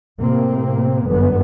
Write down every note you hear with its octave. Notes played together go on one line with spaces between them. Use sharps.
A2 C3 A#3 C4
G1 F#2 D3 B3